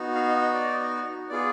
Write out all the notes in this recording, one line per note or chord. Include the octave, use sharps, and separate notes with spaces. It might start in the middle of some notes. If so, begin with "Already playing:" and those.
Already playing: B3 D#4 F#4
F5
D#5
D#5
D5
B3 F4 G#4 D5